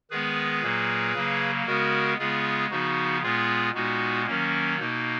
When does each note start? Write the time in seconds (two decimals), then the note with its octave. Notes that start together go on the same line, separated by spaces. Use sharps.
0.11 D#3 G#3 B3 G#4 B4
0.62 A#2 F#3 A#3
1.15 C#3 F#3 A#3
1.66 C#3 G#3 B3 F#4 A#4
2.18 C#3 G#3 B3 F4 G#4
2.71 C#3 F3 B3 D#4 F#4
3.22 A#2 G#3 B3 F4 G#4
3.74 A#2 G#3 B3 D#4 F#4
4.26 D#3 F#3 A#3 C#4
4.79 B2 A#3 D#4